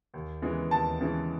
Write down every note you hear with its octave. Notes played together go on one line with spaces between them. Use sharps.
D#2
C#3 E3 G#3 B3
D#2 A5
C#3 E3 G#3 B3